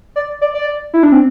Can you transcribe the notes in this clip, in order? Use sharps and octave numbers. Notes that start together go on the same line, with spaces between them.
D5
D5
D5
E4
D4
C4